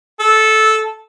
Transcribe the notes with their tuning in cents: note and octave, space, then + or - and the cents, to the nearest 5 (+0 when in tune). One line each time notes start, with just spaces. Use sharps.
A4 -10